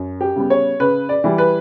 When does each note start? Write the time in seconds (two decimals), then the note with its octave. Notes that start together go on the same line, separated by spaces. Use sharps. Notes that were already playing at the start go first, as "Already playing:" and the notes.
Already playing: F#2
0.21 G4
0.35 C#3 G3 B3
0.50 C#5
0.80 C#3 B4
1.09 D5
1.24 E3 G3
1.38 B4